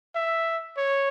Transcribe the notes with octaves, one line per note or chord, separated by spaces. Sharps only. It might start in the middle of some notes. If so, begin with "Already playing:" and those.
E5
C#5